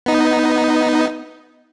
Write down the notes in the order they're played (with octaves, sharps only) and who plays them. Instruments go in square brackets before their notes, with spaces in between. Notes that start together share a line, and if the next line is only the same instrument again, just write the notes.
[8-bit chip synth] B3 D#4